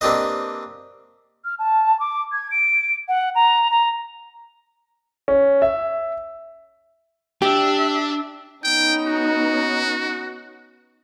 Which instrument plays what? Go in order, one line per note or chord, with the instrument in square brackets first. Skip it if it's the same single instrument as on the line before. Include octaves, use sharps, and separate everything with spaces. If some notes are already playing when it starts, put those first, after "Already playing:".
[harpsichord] A#3 C4 D4 G4 B4 D#5
[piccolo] F6
A5
D6
G#6
D7
F#5
A#5
A#5
[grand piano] C#4
E5
[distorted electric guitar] D4 [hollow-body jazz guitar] G4 [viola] E5
[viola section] B3 C#4 D#4 [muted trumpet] G5
[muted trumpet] F#4